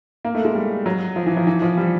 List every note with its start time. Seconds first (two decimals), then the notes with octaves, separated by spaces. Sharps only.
0.25 A#3
0.35 A3
0.45 G#3
0.55 G3
0.86 F#3
1.16 F3
1.26 E3
1.37 F3
1.47 E3
1.62 F3
1.77 G3